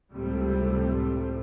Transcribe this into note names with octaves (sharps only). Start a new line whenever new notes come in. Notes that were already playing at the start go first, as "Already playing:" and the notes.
C#2 A2 C3 G3 A3 C4